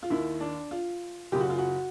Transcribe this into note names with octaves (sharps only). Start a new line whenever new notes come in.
F4
D#2 D#3 E4
D4
F4
F#1 F#2 C#3 G4
F#4
F4
F#4